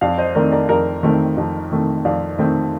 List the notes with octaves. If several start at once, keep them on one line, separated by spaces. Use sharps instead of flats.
F2 D5 F5
C5 D#5
D#3 A3 C4 A#4 D5
A#4 D5
F2 A#4 D5
D#3 A3 C4
F2
D#3 A3 C4
F2 D5 F5
D#3 A3 C4